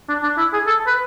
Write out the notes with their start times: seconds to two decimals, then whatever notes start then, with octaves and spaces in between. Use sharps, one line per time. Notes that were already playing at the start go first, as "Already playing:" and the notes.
0.09 D4
0.23 D4
0.38 E4
0.53 G#4
0.67 A4
0.87 B4